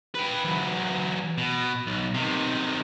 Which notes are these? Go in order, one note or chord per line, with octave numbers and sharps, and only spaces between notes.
B4 G5
E3 F#3
B2
B1
C3 D#3